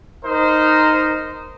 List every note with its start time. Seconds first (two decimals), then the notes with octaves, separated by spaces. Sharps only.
0.25 D#4 A#4 C5 D#5 A#5